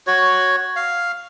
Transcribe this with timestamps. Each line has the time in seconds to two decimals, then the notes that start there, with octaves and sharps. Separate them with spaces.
0.07 F#4 C#5
0.76 F5